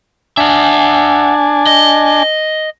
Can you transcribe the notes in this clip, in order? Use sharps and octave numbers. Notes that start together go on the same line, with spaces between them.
D4 E5 F#5 G#5 A5
D#5